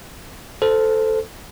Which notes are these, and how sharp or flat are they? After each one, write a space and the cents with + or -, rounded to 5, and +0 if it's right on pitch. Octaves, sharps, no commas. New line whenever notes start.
A4 +0 C5 -15